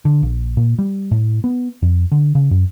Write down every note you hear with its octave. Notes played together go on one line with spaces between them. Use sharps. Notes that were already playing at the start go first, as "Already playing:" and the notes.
D3
A#1
A#2
G3
A2
B3
F2
D3
C#3
F#2